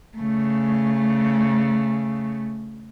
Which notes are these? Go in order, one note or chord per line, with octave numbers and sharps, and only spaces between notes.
C#3 A3